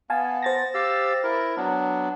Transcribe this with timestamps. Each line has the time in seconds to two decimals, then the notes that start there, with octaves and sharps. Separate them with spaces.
0.10 B3 F5 G#5 A5
0.43 C5 A6 A#6
0.74 G4 F5 E6
1.24 E4 A#4
1.57 F#3 B3 D4